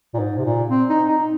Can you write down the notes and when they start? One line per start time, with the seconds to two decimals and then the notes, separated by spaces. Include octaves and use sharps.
0.14 A#2
0.19 G#2
0.38 C3
0.45 A#2
0.70 C4
0.89 D#4
1.08 D#4